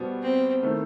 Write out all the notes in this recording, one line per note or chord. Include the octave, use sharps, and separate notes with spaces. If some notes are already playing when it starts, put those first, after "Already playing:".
Already playing: B2 G3 B3 F#4 C5
C4
D#3 A3 E4 A4 C5